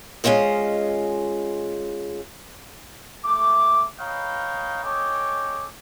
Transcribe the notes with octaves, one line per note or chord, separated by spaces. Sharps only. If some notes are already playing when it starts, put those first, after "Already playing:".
G#3 C#4 F4 C5 D#5
A3 D6
B4 C#5 D#5 F5 G5 A#5
C#4 A4 C#5 D#5 G5 D6